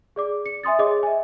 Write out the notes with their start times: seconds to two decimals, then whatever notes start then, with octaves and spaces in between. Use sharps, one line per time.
0.16 G#4 D5 D6
0.46 C#7
0.63 E5 G#5 C6 D#6 A6
0.79 G#4 C#5 D#5 D6
1.03 E5 G#5